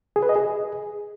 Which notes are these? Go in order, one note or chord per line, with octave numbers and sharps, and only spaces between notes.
G#4
B4
D#5
G#4